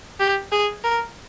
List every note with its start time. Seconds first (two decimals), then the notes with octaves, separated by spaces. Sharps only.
0.20 G4
0.52 G#4
0.84 A#4